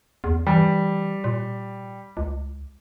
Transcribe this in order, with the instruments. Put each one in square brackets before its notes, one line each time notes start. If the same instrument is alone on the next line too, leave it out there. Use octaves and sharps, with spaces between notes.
[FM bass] E2
[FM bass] E3 [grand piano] G3
[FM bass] A#2
C#2